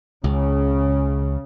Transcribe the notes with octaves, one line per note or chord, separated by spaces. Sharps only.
C#2 C#3